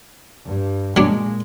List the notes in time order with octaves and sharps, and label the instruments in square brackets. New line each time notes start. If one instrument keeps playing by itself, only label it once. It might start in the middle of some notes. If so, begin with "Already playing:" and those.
[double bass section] G2
[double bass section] A#2 G#3 [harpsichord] F#3 D4